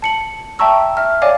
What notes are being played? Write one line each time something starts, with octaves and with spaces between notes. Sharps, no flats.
A5 C#7 F#7
E5 G5 A5 A#5 C#6 E6
E5 F6
C#5 D5 F5 G#5 D6